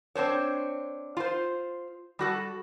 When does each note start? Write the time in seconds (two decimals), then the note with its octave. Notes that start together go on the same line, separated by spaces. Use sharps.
0.15 C4 D4 C5 C#5
1.17 F4 C5
2.19 G3 F#4 A4